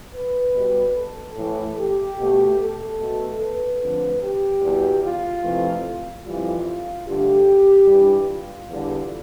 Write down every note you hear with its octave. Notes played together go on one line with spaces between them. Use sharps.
B4
B2 G3
A4
A2 E3 A3
G4
B2 A3
A4
B2 A3
B4
F2 D3 A3
G4
E2 B2 G3
F4
F2 C3 E3 A3
F2 E3 G3 F4
G2 D3 A3 G4
G2 E3 G3
F4
E2 D3 G3